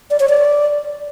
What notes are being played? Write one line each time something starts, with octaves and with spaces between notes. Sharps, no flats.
D5
C#5
D5